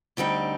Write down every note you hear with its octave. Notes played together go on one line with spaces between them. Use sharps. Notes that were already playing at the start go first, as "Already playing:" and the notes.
D2 D3 G3 C4 D#4